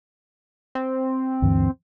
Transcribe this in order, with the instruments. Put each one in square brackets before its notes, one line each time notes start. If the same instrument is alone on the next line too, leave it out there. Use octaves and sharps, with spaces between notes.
[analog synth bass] C4
[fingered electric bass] D2 G2 E3